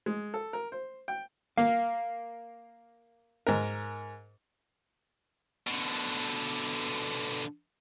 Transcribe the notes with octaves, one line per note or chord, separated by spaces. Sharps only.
G#3
A4
A#4
C5
G5
A#3 F5
G#2 A#4
B2 D3